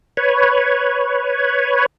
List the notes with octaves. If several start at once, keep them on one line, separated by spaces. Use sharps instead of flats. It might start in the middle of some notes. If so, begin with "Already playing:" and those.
B4 C#5